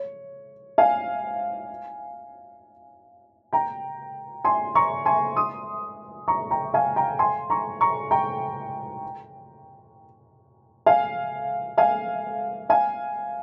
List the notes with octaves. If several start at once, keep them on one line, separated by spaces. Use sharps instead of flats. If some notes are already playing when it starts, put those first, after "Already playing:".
Already playing: C#5
F5 G#5
G5 A#5
G#5 C6
A#5 C#6
G#5 C6
C6 D#6
A#5 C#6
G5 A#5
F5 G#5
G5 A#5
G#5 C6
A#5 C#6
A#5 C#6
G5 A#5
F5 G#5
F5 G#5
F5 G#5